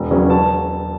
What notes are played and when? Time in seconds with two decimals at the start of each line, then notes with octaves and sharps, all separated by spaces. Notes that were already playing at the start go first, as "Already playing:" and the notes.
Already playing: E1
0.11 E2 C#3 F#3 C#4
0.30 A5